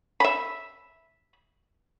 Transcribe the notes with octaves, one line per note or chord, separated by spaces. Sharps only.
E5 B5